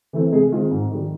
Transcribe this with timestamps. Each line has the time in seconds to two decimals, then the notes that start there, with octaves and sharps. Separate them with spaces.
0.13 E3 A3 C4
0.32 C3 G#3 G#4
0.52 D#3 G#3 C4 F4
0.71 G#2
0.91 D#3 G3